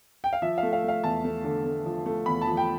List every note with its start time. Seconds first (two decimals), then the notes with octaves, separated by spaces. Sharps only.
0.24 G5
0.33 F5
0.42 F3 E5
0.58 F5
0.63 A3
0.73 F5
0.84 A3 F5
1.03 E2 A5
1.24 A3
1.44 D3
1.65 A3
1.86 F3
2.06 A3
2.26 E2 B5
2.41 A5
2.47 F3
2.57 G5